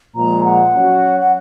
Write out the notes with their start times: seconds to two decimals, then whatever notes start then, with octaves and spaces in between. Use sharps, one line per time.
0.15 A#2 F3 G#3 A#5
0.44 F#5
0.74 F#3 C#4 F#4
1.20 F#5